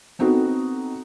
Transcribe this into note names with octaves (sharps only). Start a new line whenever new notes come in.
B3 C4 D#4 F#4 A4